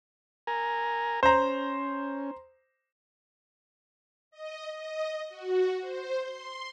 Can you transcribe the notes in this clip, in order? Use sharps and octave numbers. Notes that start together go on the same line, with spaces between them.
A#4 G#5 A#5
C#4 C5 A#5
D#5
D#5
F#4
C5
C6